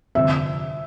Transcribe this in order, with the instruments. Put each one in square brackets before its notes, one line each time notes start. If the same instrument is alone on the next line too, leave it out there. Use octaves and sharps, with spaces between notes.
[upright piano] G1 F2 C3 [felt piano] E5